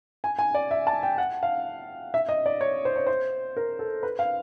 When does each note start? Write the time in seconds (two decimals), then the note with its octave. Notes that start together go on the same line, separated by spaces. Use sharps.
0.24 G#5
0.39 G#5
0.55 D5
0.71 E5
0.87 A5
1.03 G5
1.18 F#5
1.43 F5
2.14 E5
2.29 D#5
2.46 D5
2.61 C#5
2.85 C5
2.96 C#5
3.07 C5
3.57 A#4
3.79 A4
4.03 B4
4.19 F5